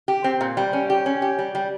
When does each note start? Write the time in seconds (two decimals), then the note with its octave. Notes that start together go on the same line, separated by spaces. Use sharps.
0.08 G4
0.24 C4
0.41 A#2
0.57 G3
0.73 C#4
0.90 G4
1.06 C#4
1.22 G4
1.39 G3
1.55 G3